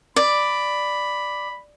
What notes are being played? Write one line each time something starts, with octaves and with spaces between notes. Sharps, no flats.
D5 B5